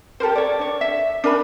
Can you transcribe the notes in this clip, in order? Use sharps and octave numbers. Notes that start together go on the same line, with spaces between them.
G4 A4 A#4 C5
C#5 D5
D4 C#5
E5
D4 A#4 G#5 B5